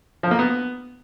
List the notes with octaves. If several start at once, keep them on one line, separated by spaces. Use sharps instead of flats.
F3
A#3
B3